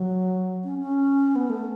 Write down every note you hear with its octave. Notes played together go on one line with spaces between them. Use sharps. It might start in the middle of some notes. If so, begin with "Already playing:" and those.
Already playing: F#3
C#4
C#4
B3
A3